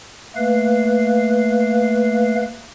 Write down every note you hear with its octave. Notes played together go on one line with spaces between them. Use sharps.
A3 A#3 B4 F5